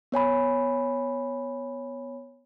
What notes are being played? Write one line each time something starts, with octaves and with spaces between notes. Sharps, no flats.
B3 C#5 G#5 B5